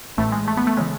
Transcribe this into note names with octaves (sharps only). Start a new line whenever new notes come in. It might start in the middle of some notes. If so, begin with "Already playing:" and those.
A1 A2 E3 A3
G#3
A3
B3
A3
C#3 E3 G#3